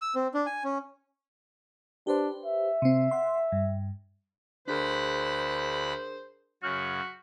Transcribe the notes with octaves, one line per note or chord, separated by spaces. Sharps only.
E6
C4
D4
G#5
C#4
D4 G4 B4 C5
E5
C3 C4
F#5 C6
G2
D2 D4 G#4 A#4 C5 B5 F#6
F#2 C#3 F#4 F6 G6 B6